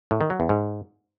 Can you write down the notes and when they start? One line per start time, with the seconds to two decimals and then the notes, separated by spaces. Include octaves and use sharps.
0.11 A2
0.21 D#3
0.30 F#3
0.40 E2
0.49 G#2